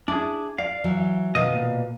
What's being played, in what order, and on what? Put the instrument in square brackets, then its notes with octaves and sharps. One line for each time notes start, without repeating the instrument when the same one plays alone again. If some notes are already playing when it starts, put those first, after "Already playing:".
[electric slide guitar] D4 G#4 [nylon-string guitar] E4
[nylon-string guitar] D5 [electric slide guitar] F5
[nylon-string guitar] E3 F#3
[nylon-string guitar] B2 F5 [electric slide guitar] D#3 D#5
[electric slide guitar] A#2